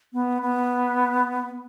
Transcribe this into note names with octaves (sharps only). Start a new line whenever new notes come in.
B3
B3